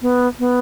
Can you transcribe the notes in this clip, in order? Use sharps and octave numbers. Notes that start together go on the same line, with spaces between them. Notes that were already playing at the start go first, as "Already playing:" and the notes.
B3
B3